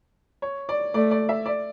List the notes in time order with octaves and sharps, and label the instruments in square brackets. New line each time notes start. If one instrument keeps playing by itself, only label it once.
[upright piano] C#5
D5
[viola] A3 [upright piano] D5
[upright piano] D5
E5
D5